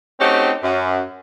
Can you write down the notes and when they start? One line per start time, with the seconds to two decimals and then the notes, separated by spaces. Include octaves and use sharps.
0.20 A3 C4 C#4 D#4 F#4 G4
0.63 F#2